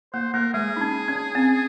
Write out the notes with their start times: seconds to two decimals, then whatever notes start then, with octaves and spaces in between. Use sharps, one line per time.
0.13 A#3 C5
0.34 A#3 A#4
0.54 G#3 G#4
0.76 D#4
0.81 C#4
1.08 C#4
1.35 C4